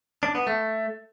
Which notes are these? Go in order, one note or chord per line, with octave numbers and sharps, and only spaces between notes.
D4
B3
A3